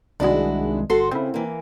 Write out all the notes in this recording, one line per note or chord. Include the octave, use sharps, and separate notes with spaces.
C2 D#3 G#3 D4 E4 F#4
G1 F#4 A4 C6
C#3 C4 E4
E3 A#3